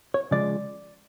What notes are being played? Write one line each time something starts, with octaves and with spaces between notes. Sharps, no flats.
C#5
C#3 F3 G#3 D5